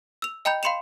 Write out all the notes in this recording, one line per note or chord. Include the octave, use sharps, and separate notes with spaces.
E6 F7
D#5 G5 A#5 B5 G6
F5 B5 C6 C#7 E7 F7